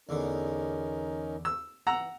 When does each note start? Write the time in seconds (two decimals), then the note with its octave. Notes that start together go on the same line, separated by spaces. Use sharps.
0.09 E2 D3 C#4 D#4 A#4
1.45 E6
1.87 E3 F#5 A#5 E6